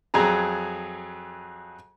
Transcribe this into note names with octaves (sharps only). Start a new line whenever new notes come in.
F2 F#3 G#4 A#5